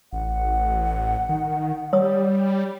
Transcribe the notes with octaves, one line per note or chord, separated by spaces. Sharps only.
A1 F#5
D#3
G3 C#5 D#6